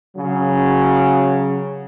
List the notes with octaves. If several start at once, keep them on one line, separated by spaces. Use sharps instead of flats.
C#3 F#3